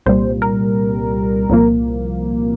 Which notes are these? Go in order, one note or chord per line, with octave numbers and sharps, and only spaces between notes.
C2 A#2 G3 C5
A#4
C2 A#2 F3 A#3